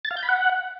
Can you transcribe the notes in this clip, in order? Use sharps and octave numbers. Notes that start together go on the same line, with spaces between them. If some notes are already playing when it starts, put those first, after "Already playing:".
A6
F5
G6
B5
F#5